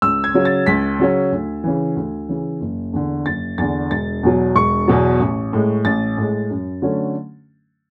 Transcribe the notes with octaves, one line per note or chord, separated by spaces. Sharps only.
C#2 E6
G#6
C#3 F#3 C#4
A6
C#2 B6
C#3 F#3 C#4
D2
C#3 E3
D2
C#3 E3
F#1
E2 D3
F#1 A6
E2 D3 A6
E1 A6
E2 B2 F#3
E1 C#6
E2 B2 F#3
A1
A2 G#3
A1 A6
A2 G#3
F#2
D3 F#3 A3 C#4